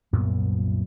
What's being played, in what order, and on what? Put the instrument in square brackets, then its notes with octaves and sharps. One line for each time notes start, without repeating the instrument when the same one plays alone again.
[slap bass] C2 F#2 A#2 B3